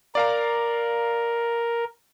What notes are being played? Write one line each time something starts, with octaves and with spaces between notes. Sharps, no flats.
A#4 D5 F5 A#5